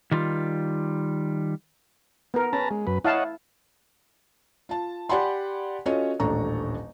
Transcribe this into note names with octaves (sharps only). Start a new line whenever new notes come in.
D#3 G3 F4
B3 A#4
C#4 B4 A5 A#5
G#3
F#2 B4
E4 C#5 D#5 F5 F#5 A5
F4 A5
G4 D5 F#5 G#5 B5 C6
C#4 F4 F#4 A4 C#5 D#5
D#1 A1 D4 A4 A#5 C#6